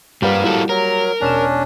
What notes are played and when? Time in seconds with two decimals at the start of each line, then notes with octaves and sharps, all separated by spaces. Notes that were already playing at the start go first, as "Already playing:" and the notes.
0.22 G2 F3 G3 A#3 G4 A#4 B4 F#5
0.44 E4 F#4 A4
0.69 F#3 A#4
1.21 E1 C#4 D4 E7